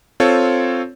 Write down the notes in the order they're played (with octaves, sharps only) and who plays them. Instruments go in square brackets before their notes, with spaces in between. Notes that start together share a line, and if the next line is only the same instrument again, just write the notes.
[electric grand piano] C4 F4 A4 C#5